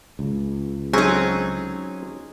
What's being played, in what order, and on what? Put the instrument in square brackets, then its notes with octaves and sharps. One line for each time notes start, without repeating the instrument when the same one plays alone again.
[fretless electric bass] C#2
[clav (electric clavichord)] F#3 C4 C#4 [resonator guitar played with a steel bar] D#4 G#4